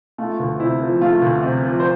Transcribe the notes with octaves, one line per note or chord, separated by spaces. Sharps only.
A3 F4
D2
C3 E4
F3
A3 F4
D2
C3
F3
C5